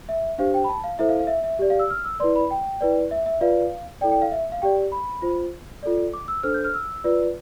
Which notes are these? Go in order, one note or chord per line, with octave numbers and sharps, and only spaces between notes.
E5
D4 G4 C5 F5
G5
B5
A5
F5
E4 A4 C5 E5
F5
F5
E5
E5
G4 D5
F5
E6
F6
E6
E4 B4 D5 C6
B5
G5
E4 B4 D5
E5
E5
F4 B4 D5 F5
E4 A4 D5 G5
G5
F5
E5
F5
G4 D5 G5
B5
F4 C5
F4 A4 D5
D6
E6
D4 A4 C5 F6
G6
F6
E6
F4 B4 D5